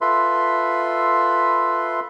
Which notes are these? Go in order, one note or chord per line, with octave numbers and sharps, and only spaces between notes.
F4 A4 B4 E5 B5 C6